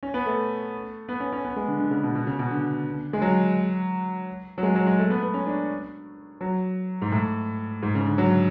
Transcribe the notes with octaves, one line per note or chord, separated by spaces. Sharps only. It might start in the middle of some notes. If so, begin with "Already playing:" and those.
C#4
B3
A3
B3
C#4
C#4
B3
G#3
D3
D3
C#3
B2
B2
C#3
B2
D3
G#3
F#3
F#3
G#3
F#3
G#3
A3
B3
B3
C#4
D4
F#3
G#2
A2
G#2
C#3
D3
F#3